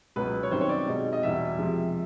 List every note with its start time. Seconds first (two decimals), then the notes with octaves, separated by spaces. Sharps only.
0.16 C#2 B2 F#3 B4
0.43 C#5
0.51 F#2 D#3 G3 C4 C5
0.61 C#5
0.69 D5
0.88 B2 G#3 C4 D#4
1.13 D#5
1.23 E2 B2 G3 E5
1.59 C3 F3 G#3